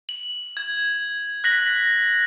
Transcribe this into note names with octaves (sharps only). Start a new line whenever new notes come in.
F#7
G#6
F#6 A#6 B6 F#7